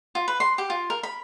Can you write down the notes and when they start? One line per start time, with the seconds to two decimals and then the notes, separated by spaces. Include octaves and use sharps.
0.15 F4
0.28 B4
0.40 C6
0.58 G4
0.70 F4
0.90 A#4
1.03 B5